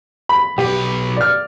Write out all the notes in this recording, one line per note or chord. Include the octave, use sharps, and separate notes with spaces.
B5
B1 G4 B4
D5 F6